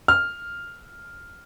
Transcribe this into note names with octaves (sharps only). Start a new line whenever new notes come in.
F6